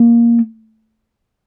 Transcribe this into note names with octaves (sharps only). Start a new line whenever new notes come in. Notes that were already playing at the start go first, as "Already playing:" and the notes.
Already playing: A#3